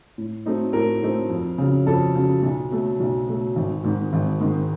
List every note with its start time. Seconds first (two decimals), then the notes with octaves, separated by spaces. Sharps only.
0.18 A2
0.46 F#3 A3 C4 D#4
0.73 A2 A#4
1.02 F#3 A3 C4 D#4
1.30 F2
1.58 C#3 F#3
1.87 F2 A4
2.15 C#3 F#3
2.43 B1
2.71 B2 F#3 A3
3.00 B1
3.28 B2 F#3 A3
3.56 G#1
3.84 G#2 D#3 G#3
4.13 G#1
4.41 G#2 D#3 G#3